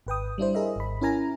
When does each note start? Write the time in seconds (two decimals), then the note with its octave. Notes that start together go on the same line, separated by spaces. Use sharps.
0.07 G#1 B4 G5 D#6
0.38 G3 D4 E4 C5
0.54 E4 G#4 A#4 D#5 E5
0.76 G#1 B5
1.01 C#4 E4 A#4 G#5 A#5